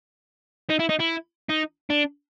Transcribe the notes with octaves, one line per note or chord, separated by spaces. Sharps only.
D#4
E4
D#4
E4
D#4
D4